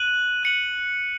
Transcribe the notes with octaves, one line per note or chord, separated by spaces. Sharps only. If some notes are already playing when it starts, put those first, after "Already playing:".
Already playing: F#6 D#7 F#7
F#6 C#7 F#7